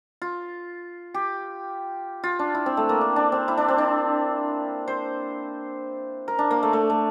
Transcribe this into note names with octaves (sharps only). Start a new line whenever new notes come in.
F4
G4
F4
D4
E4
C4
A3
A#3
D4
D4
C4
E4
D4
C4
D4
C5
A#4
D4
A#3
A3
A3
A3